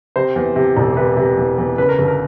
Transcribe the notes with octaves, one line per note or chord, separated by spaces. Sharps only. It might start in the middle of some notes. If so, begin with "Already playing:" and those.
C3 C5
E2
C3
E1
C3 B4
C3
E2
E2
C#3 B4
A#4
G1 A4
A#4